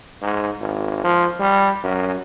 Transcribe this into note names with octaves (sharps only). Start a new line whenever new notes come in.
G#2
G#1
F3
G3
F#2